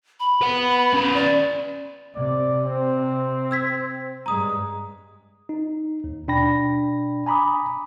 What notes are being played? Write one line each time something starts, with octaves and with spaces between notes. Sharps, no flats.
B5
B4 F#5
C#4 B4
D5
C3 D5
C4
E6 G#6 B6
G2 G#3 A#5 D#6
D#4
D#2
B2 D4 G5 B5 A#6
G#5 A#5 B5 D6 D#6